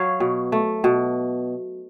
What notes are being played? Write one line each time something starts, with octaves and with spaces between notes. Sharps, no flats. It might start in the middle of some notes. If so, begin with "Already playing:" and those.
Already playing: F#3 C#5 F5
B2
A3
B2